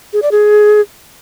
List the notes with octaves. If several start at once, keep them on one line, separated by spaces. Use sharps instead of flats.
G#4
D5
G#4